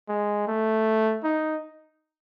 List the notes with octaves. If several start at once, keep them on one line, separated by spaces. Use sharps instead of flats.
G#3
A3
D#4